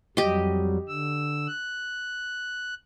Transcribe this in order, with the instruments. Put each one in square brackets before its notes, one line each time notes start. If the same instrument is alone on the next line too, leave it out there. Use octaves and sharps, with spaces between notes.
[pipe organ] F2 F#3 G3 [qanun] G4 D#5
[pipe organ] D3 E6
F#6